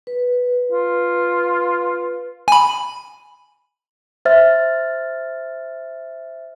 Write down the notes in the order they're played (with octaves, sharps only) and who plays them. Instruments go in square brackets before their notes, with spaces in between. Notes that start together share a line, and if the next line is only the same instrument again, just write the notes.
[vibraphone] B4
[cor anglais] F4
[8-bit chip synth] G#5 B5
[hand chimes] C5 E5 F6 A6